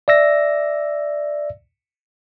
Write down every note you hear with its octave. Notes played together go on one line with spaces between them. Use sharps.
D5 E5 E6 A#6